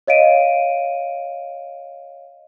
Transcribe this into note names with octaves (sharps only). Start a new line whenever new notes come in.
C#5 D#5 F5 D7 D#7